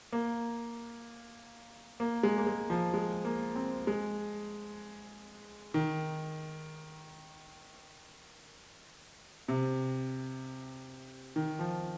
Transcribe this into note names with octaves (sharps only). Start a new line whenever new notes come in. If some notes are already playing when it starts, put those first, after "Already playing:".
A#3
A#3
G#3
A#3
G#3
F3
G#3
A#3
C4
G#3
D#3
C3
D#3
F3